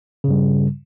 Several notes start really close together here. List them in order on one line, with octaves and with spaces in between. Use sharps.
C#3 G2 G3